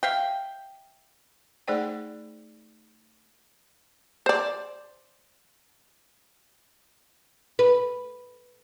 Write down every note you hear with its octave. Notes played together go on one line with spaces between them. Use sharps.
E5 F5 G5
A3 D#4 G#4 C5 D5 G5
C5 D5
B4